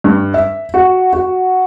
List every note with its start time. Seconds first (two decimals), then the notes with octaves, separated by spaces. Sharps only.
0.04 G2
0.34 E5
0.74 F#4
1.13 F#4